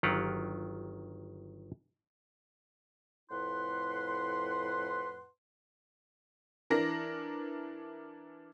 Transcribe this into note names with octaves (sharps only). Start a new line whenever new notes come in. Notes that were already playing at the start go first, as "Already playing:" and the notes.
G1 D#3 F#3 F4 G4 F#5
F2 A2 E4 B4 F#5 C6
E3 D4 A#4 A#6